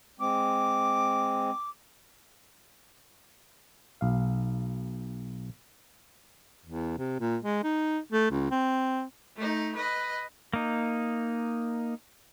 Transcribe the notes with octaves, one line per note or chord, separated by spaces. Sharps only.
G#3 C4 D6
B1 F5
E2
C3
A#2
G#3
D#4
A3
C#2
C4
A3 D#4
B4 D#5
A#3 D#4